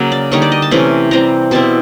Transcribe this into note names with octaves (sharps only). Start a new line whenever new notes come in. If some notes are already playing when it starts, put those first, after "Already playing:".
Already playing: C#3 F#3 A#3
D5
D3 G3 A#3 D#4 C#5
D5
D#5
A5
C3 E3 A3 C#4
E3 G3 C4 A#5
B2 G3 C4 E4 A5